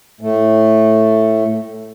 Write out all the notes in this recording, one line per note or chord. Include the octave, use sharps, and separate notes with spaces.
A2 A3